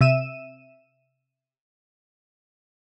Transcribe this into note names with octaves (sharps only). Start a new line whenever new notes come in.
C3 E5 D#7 E7